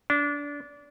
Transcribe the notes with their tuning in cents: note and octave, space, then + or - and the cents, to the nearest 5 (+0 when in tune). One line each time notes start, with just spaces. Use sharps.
D4 -25